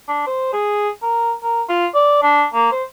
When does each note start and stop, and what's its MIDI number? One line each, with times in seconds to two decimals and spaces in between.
0.08 0.25 62
0.27 0.53 72
0.53 0.90 68
1.03 1.33 70
1.43 1.62 70
1.69 1.87 65
1.95 2.18 74
2.23 2.45 62
2.54 2.69 58
2.72 2.83 72